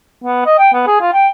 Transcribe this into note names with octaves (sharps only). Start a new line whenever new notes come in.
B3
D#5
G5
B3
G#4
F4
G5